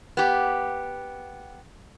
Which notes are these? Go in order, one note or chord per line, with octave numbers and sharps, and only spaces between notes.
B3 G4